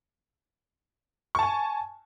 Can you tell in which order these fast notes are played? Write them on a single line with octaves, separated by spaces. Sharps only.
C#6 A5 G#5